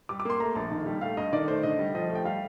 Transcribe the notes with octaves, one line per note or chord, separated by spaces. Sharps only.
G3 D6
D6
A#3 C6
A3 A#5
A#1 A5
D#3
G3
A3 F5
G2 D#5
D#3 D5
A3 C5
D3 D#5
G3
F3 D#5
A3
G5
G3 F5